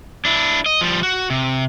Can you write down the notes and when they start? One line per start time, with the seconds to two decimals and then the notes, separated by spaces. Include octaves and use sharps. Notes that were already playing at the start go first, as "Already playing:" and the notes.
0.25 D4 E4
0.66 D#5
0.81 F3 G3
1.03 F#4
1.30 C3